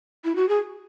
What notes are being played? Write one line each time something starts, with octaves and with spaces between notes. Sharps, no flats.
E4
F#4
G#4